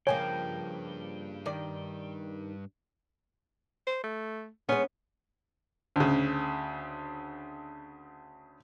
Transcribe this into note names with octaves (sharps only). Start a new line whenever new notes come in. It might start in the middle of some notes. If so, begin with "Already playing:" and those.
G2 C#3 F3 A#3 C#5 G5 G#5
D#3 D5
C5
A3
G#3 B3 C#4
D2 C#3